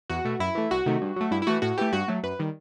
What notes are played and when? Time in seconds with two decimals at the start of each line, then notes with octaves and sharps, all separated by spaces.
0.10 E2 F#4
0.25 B2 A3
0.39 F#2 E4
0.55 E3 A3
0.71 C2 F#4
0.86 C3 D#3 A3
1.02 G2
1.16 F#3 A3
1.31 G2 E4
1.42 E4
1.47 E3 A3 F#4
1.62 A2 F#4
1.78 E3 A3 G4
1.93 G2 F#4
2.08 F#3 A3
2.23 F#2 B4
2.39 D#3 G3